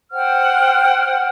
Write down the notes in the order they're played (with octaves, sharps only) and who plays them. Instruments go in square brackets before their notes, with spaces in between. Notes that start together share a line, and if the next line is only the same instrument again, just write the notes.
[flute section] C5 F#5 G5 F6